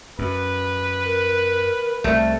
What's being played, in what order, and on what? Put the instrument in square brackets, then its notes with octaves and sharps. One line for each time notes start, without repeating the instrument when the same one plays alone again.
[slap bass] F#2 [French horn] B4
[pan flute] A#4
[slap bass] C2 [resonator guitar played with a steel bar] A3